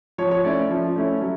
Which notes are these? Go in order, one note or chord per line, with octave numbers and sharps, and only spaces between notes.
F3 C#5
C#5
A3 C#4 E4 D5
F3
A3 C#4 E4
F#3